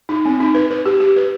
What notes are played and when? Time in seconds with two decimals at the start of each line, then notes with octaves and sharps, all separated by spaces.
0.09 D#4
0.25 C4
0.40 D#4
0.54 B4
0.70 B4
0.86 G4
1.00 G4
1.16 B4